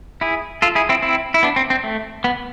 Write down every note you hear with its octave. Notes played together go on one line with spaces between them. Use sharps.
E4 G#4
F4 A4
E4 G#4
C4 E4
C4 E4
E4
B3 D4
C4
C4
A3
B3